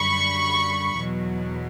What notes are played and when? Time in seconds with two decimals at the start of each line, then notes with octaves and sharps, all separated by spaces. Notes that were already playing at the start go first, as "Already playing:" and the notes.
Already playing: F#2 D3 G3 B5 C#6
0.93 E2 B2 F#3